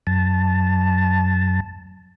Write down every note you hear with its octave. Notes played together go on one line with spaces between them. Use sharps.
F#2 A5